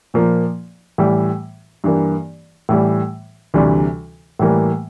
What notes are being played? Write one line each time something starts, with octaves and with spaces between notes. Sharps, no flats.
A#2 F3 A#3
A2 E3 G3
G2 E3 A#3
A2 E3 G3
D2 C3 E3 G3 D4
A2 E3 G3 A#3